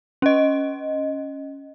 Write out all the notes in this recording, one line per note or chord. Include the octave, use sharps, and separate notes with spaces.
C#4 D#5